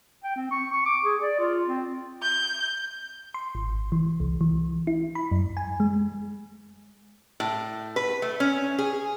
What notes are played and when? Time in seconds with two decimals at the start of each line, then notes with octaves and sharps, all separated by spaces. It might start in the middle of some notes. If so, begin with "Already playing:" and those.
0.24 G5
0.36 C4
0.51 C#6
0.73 C#6
0.86 D6
1.04 G#4
1.21 D5
1.39 F4
1.66 C4
2.22 G6
3.34 C6
3.55 G#1
3.92 E3
4.20 C2
4.41 E3
4.87 E4
5.15 B5
5.31 F#2
5.57 G#5
5.80 G#3
7.40 A2
7.96 B4
8.22 A3
8.40 C#4
8.79 G#4